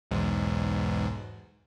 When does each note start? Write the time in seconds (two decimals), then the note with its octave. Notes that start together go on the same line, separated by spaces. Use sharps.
0.11 B1 E2 G#2